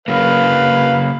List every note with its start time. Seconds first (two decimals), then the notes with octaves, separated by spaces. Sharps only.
0.08 C#3 F#3 A#3 B4 F5